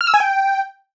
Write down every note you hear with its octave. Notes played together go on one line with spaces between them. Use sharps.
F6
E6
G#5
G5